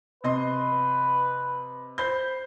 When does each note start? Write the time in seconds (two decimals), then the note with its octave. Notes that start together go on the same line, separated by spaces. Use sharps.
0.24 C3 B4 D#5 C6
1.98 C5 B5 G6